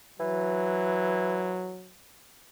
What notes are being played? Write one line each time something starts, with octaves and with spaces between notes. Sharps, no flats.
E3 F#3